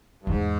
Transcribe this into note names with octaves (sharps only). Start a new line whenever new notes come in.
G2
E2 G#2